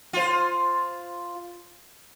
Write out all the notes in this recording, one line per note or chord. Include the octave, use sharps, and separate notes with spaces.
F4 C5